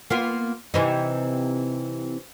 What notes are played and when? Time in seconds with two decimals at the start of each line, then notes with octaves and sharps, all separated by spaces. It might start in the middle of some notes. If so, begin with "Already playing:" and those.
0.10 A#3 B3 F4
0.74 C3 E3 D#4